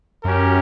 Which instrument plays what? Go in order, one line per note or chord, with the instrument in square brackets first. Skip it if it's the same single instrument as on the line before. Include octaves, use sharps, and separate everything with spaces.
[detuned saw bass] F#2 [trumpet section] C#4 G4 A#4